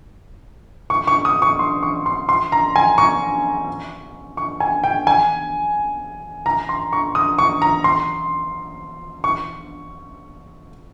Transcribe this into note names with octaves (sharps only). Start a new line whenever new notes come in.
C#6
C#6
D#6
C#6
C6
C#6
C6
C6
A#5
G#5
C#6
C#6
G#5
G5
G#5
A#5
C6
C#6
D#6
C#6
A#5
C6
C#6